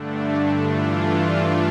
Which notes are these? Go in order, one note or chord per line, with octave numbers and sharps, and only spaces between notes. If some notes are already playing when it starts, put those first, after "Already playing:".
Already playing: G2 D3 A3 D4
G2 E3 A3 D4 F4